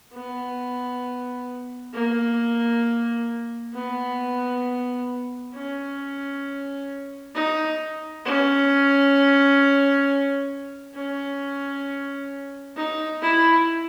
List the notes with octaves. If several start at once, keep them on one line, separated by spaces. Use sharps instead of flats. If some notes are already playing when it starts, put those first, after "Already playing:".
B3
A#3
B3
C#4
D#4
C#4
C#4
D#4
E4